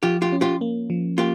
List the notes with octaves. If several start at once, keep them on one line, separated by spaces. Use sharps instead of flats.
F3 F4 G4
F4 G4
C#4
F4 G4
A#3
F3
A#3 F4 G4